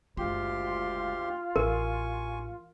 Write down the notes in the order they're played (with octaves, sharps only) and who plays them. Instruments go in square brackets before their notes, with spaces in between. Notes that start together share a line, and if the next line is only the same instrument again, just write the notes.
[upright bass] F#1 G#3 [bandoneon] D2 G4 C6 [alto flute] F4
[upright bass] A1 [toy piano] A#4 [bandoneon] G#5 C#6